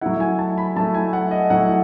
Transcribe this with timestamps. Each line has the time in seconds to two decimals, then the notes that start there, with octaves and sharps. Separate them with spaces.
0.01 F#3 A3 E4 F#5
0.20 G#5
0.39 A5
0.58 B5
0.76 F#3 A3 E4 A5
0.94 G#5
1.13 F#5
1.31 D#5
1.50 F#3 A3 E4 F#5